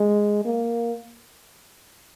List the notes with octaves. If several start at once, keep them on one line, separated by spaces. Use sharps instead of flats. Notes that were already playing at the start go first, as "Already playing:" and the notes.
Already playing: G#3
A#3